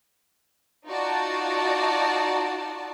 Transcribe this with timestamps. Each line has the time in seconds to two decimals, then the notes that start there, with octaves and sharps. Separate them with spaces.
0.88 D#4 F4 F#4 D5 A5